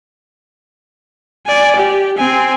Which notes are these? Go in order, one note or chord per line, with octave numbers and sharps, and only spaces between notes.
D5 G#5
G4
C4 G#5